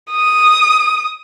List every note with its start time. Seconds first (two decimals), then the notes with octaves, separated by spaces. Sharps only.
0.12 D#6